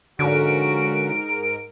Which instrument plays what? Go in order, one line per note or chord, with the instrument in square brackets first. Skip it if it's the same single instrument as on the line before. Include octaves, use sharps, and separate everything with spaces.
[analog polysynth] G#2 A#4 [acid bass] D3 [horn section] F3 C#4 F#4 [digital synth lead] D7